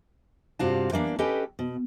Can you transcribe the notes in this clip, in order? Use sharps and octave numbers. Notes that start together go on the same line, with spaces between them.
G2 C3 F4 F#4 F5 A5
E3 A#3 C4 D4
C#4 G4 A4 B4 D#5 G5
B2